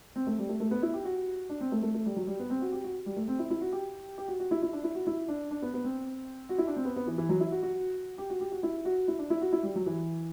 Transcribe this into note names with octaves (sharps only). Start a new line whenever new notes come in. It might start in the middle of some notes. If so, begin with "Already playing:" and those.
C4
A3
G3
A3
A3
B3
E4
G4
F#4
D4
C4
A3
A3
A3
G3
F#3
G3
B3
C4
F#4
G4
F#4
G3
A3
C4
E4
E4
F#4
G4
G4
F#4
F#4
E4
E4
D4
E4
F#4
E4
D4
D4
B3
B3
C4
F#4
E4
D4
C4
B3
B3
E3
E3
F#3
E4
F#4
F#4
G4
F#4
G4
F#4
E4
F#4
E4
D4
E4
F#4
E4
G3
F#3
E3